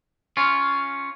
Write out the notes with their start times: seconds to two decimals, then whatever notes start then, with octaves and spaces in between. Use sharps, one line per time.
0.37 C#4 F4